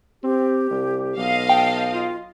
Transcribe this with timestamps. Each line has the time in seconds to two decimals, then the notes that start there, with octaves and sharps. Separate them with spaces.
0.23 C4 G4
0.71 C2
1.17 B1 D#5 F5
1.49 G5 A5
1.92 F4